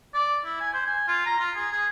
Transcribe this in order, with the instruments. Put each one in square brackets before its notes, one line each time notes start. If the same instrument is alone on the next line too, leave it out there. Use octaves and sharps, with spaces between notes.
[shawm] D5
E4
G#5
C5
G#5
F4
A#5
F4
G#4
G#4